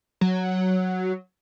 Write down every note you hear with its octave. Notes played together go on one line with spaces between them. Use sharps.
F#3